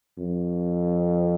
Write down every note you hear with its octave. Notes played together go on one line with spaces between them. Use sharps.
F2